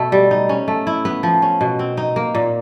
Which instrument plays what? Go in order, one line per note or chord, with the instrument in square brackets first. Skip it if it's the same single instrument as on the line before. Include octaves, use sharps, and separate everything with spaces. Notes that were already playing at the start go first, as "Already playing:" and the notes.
Already playing: [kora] B2 A3 B3
G3
D#4
C#4
A3
E4
B3
F3
C#4
B2
C4
D#4
A#3
A#2